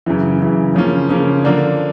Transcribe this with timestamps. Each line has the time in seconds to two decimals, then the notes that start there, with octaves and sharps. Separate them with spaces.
0.06 F#2 C#3 E3
0.41 F#2 C#3 E3
0.75 C#3 F3 A#3 C#4
1.09 C#3 F3 A#3 C#4
1.44 D3 F3 A#3 D4